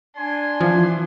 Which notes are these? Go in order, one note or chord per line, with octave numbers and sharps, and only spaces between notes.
D4 G#5 C6
E3 F3